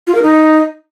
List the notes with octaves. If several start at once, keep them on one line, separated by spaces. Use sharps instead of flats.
F4
A#4
D#4